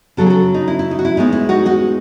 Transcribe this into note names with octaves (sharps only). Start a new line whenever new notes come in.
C#3 F#3 B3 F#4 A4
G#4
F#4 A4
D#4
E4
E4
D#4
F#4
E4
A2 G#3 B3 D#4
E4
D#4 F#4
D#4 F#4